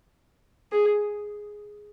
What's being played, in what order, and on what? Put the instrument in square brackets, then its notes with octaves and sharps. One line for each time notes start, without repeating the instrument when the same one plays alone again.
[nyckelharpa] G#4